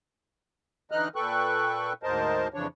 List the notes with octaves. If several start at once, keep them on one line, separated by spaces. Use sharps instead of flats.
D3 E3 D#4 D#5 F6 F#6
A#2 A4 B4 G5 C#6 F#6
D2 G#2 A#4 C5 D#5 A5
F2 C#3 E3 F3 D4 C#5